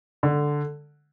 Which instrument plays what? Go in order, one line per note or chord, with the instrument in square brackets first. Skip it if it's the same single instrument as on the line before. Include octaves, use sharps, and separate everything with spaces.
[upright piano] D3